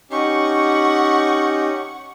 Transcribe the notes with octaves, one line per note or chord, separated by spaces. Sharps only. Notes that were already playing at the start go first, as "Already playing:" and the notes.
C#4 D#4 G4 F#5 C#6